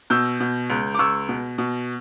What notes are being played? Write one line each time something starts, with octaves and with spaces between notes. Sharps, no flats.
B2 E6 G6
B2
C#2
D6
C#2 C#6 E6
B2
B2